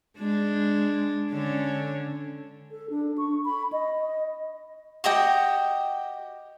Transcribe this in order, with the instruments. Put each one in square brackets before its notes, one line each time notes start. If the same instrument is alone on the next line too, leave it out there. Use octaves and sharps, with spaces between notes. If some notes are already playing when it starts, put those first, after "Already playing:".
[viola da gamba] G#3 D4
D3 C#4 D4
[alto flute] A4
D4
C#6
B5
D#5
[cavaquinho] F#4 G4 D#5 G5